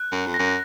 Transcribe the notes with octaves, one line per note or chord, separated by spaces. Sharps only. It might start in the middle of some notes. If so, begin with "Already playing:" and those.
Already playing: F#6
F#2
F2
A#6
F#2